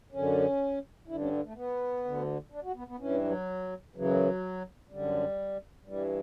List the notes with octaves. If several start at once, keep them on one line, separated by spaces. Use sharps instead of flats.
F#2 D3 C#4
G2 D3 E4
C#4
G3
A3
B3
D2 D3
D4
F#4
B3
B3
G2 E3 C#4
F#3
F#2 C#3 E3 F#3
F#2 D3 G3
G2 E3 G3